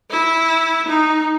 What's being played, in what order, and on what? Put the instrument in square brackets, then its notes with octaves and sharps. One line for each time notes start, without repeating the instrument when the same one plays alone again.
[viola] E4
D#4